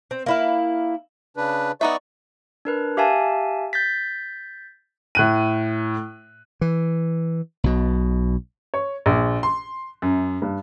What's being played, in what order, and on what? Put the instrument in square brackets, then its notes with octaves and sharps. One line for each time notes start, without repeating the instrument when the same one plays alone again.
[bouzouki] C4
A#3 E4 F5
[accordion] C#3 D4 B4
[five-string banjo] B3 D#4 E5 [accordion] D5 C#6
[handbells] D4 A#4 B4
G4 E5 F5 G#5 A5
G6 A6 B6
[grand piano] A2 F#6 D#7
[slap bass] E3
B1 B2
[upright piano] C#5
A#1
C6
F#2
G2